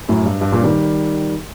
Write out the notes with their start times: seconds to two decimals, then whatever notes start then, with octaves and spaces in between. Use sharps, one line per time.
0.09 F#2 A2
0.25 G2
0.41 G2
0.52 G2 A#2
0.63 D#3 G3